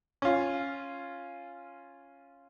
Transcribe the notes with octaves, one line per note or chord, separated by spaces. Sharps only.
C#4 F4